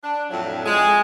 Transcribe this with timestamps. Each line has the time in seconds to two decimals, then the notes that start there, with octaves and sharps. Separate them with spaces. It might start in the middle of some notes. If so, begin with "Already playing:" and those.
0.03 D4
0.30 F2 A2 F#3
0.66 G#3